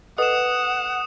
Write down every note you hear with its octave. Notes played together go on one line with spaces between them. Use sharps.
A4 B4 D#5 F#5 D#6 E7